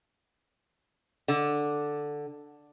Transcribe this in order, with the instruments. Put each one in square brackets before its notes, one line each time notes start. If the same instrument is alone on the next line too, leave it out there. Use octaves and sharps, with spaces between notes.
[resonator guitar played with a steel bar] D3